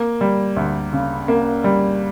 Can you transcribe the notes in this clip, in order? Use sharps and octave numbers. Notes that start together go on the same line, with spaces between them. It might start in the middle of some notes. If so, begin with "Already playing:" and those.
Already playing: A#3
G3
D2
C#3
A#3
G3